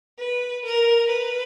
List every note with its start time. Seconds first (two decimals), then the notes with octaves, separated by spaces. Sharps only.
0.19 B4
0.65 A#4
1.09 B4